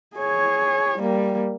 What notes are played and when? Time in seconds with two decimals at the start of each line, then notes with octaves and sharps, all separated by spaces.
0.16 G#4 C#5
0.98 G3 A#3